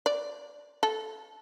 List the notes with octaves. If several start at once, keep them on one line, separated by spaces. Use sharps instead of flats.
D5
A4